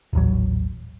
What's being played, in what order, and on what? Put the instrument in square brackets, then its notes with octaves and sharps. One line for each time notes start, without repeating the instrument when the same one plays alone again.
[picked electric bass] D#1 A1 F#3